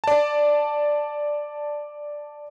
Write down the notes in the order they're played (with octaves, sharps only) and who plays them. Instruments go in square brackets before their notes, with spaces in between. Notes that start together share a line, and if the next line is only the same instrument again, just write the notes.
[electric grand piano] D5 A5